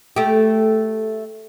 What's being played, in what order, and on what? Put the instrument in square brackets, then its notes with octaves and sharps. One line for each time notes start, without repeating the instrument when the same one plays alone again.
[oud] A3 G4